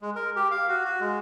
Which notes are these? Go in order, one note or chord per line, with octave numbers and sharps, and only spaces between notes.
G#3
A#4
G4
F5
F#4
F#4
G#3